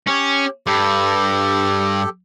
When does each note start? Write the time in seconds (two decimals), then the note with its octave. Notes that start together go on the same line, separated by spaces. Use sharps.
0.07 C#4 G4
0.67 G2 G4 A4